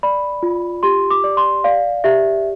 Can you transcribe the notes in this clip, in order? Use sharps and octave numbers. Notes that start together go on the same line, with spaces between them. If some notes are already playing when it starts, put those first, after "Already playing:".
D5 B5
F4
G4 C6
D6
D5
C6
D5 F5
G4 E5